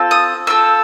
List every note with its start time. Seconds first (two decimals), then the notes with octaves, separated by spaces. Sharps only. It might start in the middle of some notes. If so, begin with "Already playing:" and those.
Already playing: C4 F4 A4
0.11 D#6
0.47 C4 F4 A4 E6